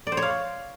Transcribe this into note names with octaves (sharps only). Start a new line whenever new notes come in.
D5
C5
C#5
F5